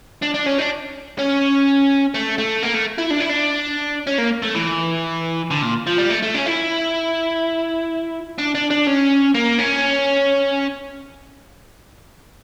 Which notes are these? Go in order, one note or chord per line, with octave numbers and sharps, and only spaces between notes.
D4
D4
C#4
D4
C#4
A3
A3
A#3
A3
E4
D4
E4
D4
C#4
A#3
A3
E3
D3
A#2
F3
G3
A3
A3
C#4
E4
D4
D4
D4
C#4
A#3
C#4